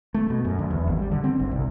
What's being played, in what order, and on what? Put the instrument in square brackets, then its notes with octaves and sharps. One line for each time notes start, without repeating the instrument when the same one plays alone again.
[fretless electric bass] A3
B2
F#2
D2
E2
G#1
G3
D3
C4
G1
C2